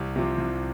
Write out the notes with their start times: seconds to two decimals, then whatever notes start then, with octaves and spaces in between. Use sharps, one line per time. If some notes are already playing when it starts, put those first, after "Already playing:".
Already playing: C2 G4
0.16 C3 F3
0.38 C2